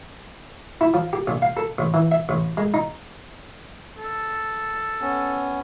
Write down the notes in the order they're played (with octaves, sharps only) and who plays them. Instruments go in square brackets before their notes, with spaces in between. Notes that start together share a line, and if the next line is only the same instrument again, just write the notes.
[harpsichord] E4
F3
G4
A#1
F5
A4
A1
E3
E5
A1
G#3
D#4
[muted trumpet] A4
[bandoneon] B3 C#4